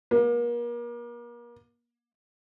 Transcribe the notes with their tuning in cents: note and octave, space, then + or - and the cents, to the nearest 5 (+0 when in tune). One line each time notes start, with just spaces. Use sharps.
A#3 +40